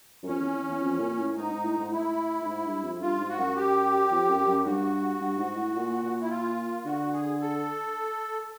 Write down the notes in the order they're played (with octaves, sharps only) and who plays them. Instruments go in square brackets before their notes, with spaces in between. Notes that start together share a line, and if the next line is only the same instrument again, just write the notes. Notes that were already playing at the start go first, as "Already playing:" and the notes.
[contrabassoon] F#2
[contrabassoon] F2 [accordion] C#4
[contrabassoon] E2
E2
E2
F2
A#2
A2
[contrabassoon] G#2 [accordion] D#4
[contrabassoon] G#2
A2
G#2
[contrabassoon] A2 [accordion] E4
[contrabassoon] A2
G#2
G2
F2
[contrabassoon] G2 [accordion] F4
[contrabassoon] G#2
[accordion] F#4
[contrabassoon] F#2
[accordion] G4
[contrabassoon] F2
F#2
F#2
[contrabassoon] G2 [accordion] F#4
[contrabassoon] G2
G#2
A2
A#2
A#2
[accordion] E4
F4
[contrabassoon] D3 [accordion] F#4
[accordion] G#4
A4